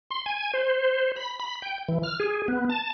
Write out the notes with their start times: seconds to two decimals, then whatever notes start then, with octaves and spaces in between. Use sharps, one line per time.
0.11 C6
0.26 G#5
0.54 C5
1.16 B5
1.40 B5
1.62 G5
1.88 E3
2.03 F6
2.20 G#4
2.48 B3
2.70 A5